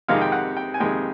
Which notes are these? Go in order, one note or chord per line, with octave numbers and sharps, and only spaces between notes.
F2 C3 D#3 G#3 F5
G5
F#5
G5
G#5
F2 C3 D#3 G#3 G5